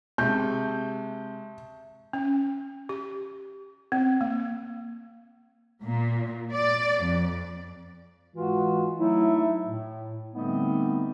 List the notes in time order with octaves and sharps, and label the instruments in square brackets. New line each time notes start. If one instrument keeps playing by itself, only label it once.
[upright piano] C3 [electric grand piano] G#3 [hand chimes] E5 A5 C#6 [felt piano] G6
[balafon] C#4
G4
C4
A#3
[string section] A#2
D5
F2
[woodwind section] G#2 E3 G#3 F4 F#4
F#3 A3 D#4 E4
A2
D3 G3 A3 B3 C4 D#4